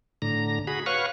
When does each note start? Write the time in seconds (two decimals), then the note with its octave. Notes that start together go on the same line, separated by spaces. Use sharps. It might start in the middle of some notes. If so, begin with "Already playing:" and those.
0.22 A2 D3 A#5
0.67 F#4 G#4 B5
0.86 B4 C#5 F5 F#5 C#6